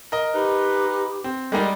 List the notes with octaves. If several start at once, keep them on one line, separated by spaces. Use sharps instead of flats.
A#4 D#5
D#4 G4 B4
C4
G3 G#3 A#3 D#4